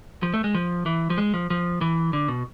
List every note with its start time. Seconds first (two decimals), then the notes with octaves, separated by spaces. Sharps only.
0.23 F3
0.34 A3
0.44 G#3
0.55 F3
0.86 E3
1.10 F3
1.18 G#3
1.34 F3
1.50 F3
1.81 E3
2.13 D3
2.28 B2